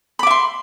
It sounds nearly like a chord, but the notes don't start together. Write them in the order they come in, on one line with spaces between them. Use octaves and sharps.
B5 D6 E5 C6